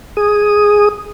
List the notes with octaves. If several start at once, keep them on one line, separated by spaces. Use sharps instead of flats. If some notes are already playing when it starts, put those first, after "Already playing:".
G#4 D#6